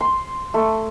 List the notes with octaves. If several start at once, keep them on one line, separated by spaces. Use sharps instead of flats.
C6
A3